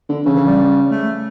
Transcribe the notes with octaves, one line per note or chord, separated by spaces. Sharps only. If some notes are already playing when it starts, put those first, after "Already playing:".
D3
C#3 E3
E3
G3
A3